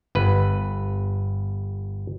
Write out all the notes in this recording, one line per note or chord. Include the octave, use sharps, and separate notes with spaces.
G1 B4